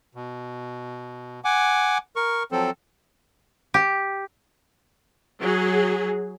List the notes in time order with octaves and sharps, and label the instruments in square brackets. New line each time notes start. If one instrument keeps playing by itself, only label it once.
[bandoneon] B2
F#5 G#5 D6
A#4 C#6
F3 F#3 C4 A4
[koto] G4
[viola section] F#3 G#4